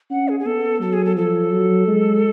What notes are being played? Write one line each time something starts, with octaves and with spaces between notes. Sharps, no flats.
C#4 F#5
G#4
G#4
B3 A4
F#3 A4
G#4
A4
F3 A4
F#3
G#3